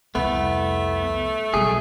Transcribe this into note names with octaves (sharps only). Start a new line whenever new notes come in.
C2 F2 A3 B3
B1 G3 G#4